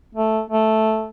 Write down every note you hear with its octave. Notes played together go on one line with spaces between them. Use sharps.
A3
A3